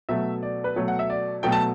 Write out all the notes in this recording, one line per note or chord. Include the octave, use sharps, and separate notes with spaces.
B2 F#3 A3 E5
D5
B4
B2 F#3 A3 C#5
F#5
E5
D5
B2 F#3 A3 G5
A5